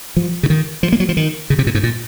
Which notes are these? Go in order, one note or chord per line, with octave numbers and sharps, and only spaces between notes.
F3
C#3
D#3
F3
A#3
F#3
F3
D#3
C#3
C3
A#2
G#2
A#2